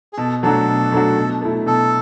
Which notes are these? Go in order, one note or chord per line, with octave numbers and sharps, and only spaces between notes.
G#4
B2 A4
F#3 A3 D4 F#4 A4
B2
F#3 A3 D4 F#4
B2
A3 E4
B2 A4